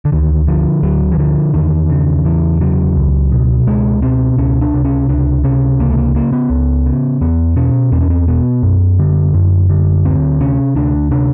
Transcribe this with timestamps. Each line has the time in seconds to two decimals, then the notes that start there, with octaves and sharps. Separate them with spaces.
0.05 D3
0.12 D2 D#3
0.47 D3 F3
0.83 D2 F#3
1.12 E3
1.18 D3 F3
1.54 E2 D#3
1.90 C#3
2.25 E2 E3
2.60 C#3 F#3
2.96 C#2
3.32 B2
3.67 C#2 G#3
4.02 B2 C4
4.38 C#2 C#4
4.61 D4
4.73 C3
4.84 C#4
5.09 C#2 D4
5.44 C3 C#4
5.79 C#2 A#3
5.90 A3
5.97 A#3
6.15 C#3 A#3
6.33 B3
6.50 C#2
6.86 C#3
7.21 E2 B3
7.56 B2 C#4
7.92 E2 C4
8.01 C#4
8.10 C4
8.28 B2 B3
8.63 F#2
8.99 D3
9.34 F#2
9.69 D3
10.05 D2 C4
10.40 C3 C#4
10.75 D2 D4
11.11 C3 D4